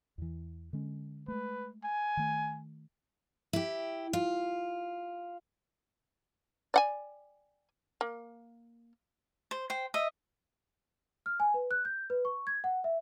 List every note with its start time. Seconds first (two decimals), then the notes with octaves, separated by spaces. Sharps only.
0.18 E2 E3
0.73 D3 G#3 C#4
1.28 G#3 A3 B4
1.84 G#5
2.17 D#3 A3
3.53 E4 G4
4.13 F4
6.74 D5 F#5 G#5
8.01 A#3
9.51 C5
9.70 C5 G5
9.94 D#5 E5
11.26 F6
11.40 G#5
11.54 B4
11.71 F#6
11.85 G6
12.10 B4
12.25 C#6
12.47 G#6
12.64 F#5
12.84 E5